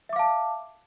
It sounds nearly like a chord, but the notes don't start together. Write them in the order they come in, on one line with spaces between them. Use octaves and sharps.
E5 D6 F5 A5